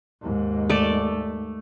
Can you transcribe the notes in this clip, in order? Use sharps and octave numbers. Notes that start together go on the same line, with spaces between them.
D#2 G#2
A3 D5